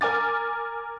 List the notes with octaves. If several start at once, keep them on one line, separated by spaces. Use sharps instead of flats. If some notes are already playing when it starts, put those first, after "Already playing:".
A#4 G#5 D6 A6